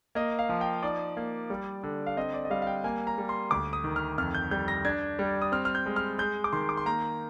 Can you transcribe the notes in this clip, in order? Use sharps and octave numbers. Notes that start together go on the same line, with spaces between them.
A#3 D#5
F5
F3
G5
D#4 D5
A#3
G3
D3
F5
C4 D#5
D5
D#5
G3 F5
F5
G5
A#3 G#5
A#5
G3
C6
D2 D6
D#6
D#3
F6
F2 F6
G6
G3 G6
A#6
D4 G#6
G3
D#6
C4 F6
F6
G6
G#3
F6
G#3 G6
D6
D#3 C6
D6
C6
A#3 A#5